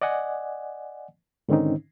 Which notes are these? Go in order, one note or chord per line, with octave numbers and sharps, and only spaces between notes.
D5 D#5 F#5 G#5
G#2 D3 D#3 C4 C#4 D#4